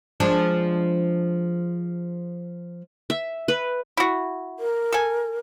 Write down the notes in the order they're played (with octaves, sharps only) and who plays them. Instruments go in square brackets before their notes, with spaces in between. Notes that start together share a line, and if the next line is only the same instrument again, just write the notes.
[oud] F3 G#3 D4
[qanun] E5
B4
[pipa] E4 F#4
[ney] A#4
[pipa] A4 G#5